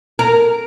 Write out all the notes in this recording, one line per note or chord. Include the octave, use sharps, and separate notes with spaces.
A#4